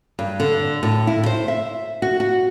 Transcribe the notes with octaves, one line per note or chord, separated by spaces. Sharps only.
G2
D3
A2
E4
C5
E5
F#4
F#4